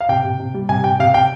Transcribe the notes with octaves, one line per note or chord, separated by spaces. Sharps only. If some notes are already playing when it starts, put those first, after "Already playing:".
F5
C3 G5
C3
C3
G3
C3 G#5
C3 G5
C3 F5
C3 G5